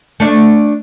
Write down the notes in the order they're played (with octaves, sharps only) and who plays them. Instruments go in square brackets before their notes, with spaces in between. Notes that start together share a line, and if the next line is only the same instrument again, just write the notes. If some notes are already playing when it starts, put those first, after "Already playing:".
[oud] A3 D4 E5